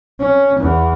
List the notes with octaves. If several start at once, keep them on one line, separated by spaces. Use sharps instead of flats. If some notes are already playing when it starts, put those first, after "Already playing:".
C#4
E2